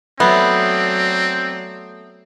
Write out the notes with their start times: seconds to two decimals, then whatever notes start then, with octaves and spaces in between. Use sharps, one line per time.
0.20 F#3 A3 B3 C4 D5